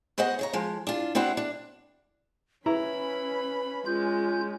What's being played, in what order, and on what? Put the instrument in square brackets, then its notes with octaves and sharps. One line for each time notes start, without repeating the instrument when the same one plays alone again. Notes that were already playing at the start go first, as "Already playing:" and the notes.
[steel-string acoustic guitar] B3 F#4 C5 D#5 F#5
C#3 C#5 A#5
F3 G#3
D4 F4
B3 C4 D4 E4 F#4
D4
[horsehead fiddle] C#4 B5 [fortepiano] E4 A#5 [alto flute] B4
[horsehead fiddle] G#3 C#4 [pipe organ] F4 G6